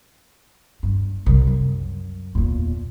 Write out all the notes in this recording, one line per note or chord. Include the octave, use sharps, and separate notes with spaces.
G2
C2
F#2
E2 A#2